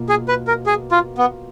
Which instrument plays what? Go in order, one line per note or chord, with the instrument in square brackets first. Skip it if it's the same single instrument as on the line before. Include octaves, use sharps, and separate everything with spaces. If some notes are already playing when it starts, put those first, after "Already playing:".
Already playing: [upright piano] B2 A#3 F4
[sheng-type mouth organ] G#4
B4
A#4
G#4
F4
B3